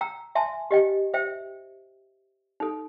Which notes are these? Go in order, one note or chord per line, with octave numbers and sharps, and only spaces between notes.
G5 A#5 E6
E5 G#5 A5 C6
G4 D#5 G5
C5 E5 G5
D#4 A4